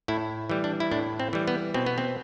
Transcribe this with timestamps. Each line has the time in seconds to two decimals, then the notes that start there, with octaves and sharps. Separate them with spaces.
0.08 A2 E4
0.50 E3 G3
0.64 D4
0.80 E4
0.91 A2 D4
1.20 C4
1.33 E3 G3
1.47 B3
1.74 B2 C4
1.86 B3
1.98 C4